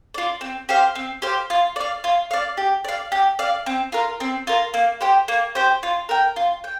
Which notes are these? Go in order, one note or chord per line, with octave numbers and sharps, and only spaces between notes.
F4 D5
C4
G4 C5 F5
C4
G4 C5 F5
F4
D5 F5
F4
D5 F5
G4
D5 F5
G4
D5 F5
C4
F4 A#4
C4
F4 A#4
A#3
G4 C5 G5
A#3
G4 C5 G5
F4
A#4 G5
F4
G5